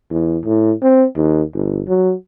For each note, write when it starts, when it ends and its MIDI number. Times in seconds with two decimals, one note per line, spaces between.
0.10 0.38 40
0.44 0.72 45
0.83 1.05 60
1.16 1.43 39
1.54 1.82 31
1.88 2.13 54